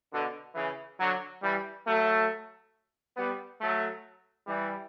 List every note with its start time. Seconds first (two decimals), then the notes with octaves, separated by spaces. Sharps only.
0.11 B2 D3
0.54 C#3 E3
0.98 D3 F#3
1.42 E3 G3
1.86 F#3 A3
3.16 G3 B3
3.59 F#3 A3
4.46 E3 G3